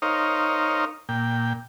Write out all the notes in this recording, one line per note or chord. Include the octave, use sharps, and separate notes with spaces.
D#4 A#4 C5 C#5 D#5 F5
A#2 G5